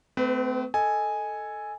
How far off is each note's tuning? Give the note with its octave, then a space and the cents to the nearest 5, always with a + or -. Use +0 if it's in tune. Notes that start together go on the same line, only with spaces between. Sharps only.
A3 +0 C4 -35 B4 +25
A4 +0 D#5 +0 G#5 +0